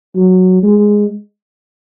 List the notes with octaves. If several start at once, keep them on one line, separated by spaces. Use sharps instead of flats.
F#3
G#3